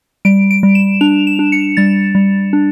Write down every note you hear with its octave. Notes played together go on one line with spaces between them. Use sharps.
G3 D7
D7
G3
E7
D4 F7
E7
D4
C#7
G3 A6
G3
D4